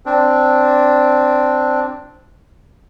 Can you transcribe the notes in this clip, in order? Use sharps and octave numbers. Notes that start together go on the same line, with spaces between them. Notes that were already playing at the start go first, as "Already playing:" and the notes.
C4 D4